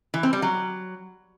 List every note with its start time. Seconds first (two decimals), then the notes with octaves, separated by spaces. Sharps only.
0.14 E3
0.23 C4
0.33 G3
0.42 F#3